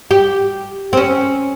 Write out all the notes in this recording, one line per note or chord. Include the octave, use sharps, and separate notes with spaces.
G4
C4
C#4